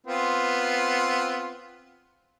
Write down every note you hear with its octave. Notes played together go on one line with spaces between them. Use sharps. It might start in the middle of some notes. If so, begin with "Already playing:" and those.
B3 C4 F4